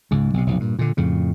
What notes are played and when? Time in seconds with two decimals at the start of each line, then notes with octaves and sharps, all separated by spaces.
0.11 C#2 G#2
0.34 B1 C3
0.46 F1 B1
0.60 G2 A#2
0.79 A#2 D3
0.97 F2 A2 C#3